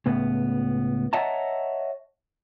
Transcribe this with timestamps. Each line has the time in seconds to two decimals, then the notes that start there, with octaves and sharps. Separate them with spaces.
0.06 C#2 A2 B3
1.13 C#5 D#5 E5 F#5 A5 A#5